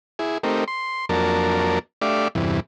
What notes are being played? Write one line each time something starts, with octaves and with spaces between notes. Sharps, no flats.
E4 G#4
A3 C4 D#4 G4 A#4
C6
F2 F#3 A#3 D4 A#4 A5
A3 D4 G4 D5 E5 F5
E2 G2 C3 E3